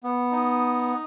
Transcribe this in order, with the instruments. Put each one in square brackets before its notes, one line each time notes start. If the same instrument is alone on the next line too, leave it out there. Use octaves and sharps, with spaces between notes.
[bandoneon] B3
[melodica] D#4